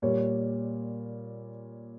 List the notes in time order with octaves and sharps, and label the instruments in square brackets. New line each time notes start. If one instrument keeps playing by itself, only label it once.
[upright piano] A#2 G3 C#5